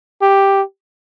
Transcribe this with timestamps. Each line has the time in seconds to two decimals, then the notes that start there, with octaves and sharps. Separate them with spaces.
0.22 G4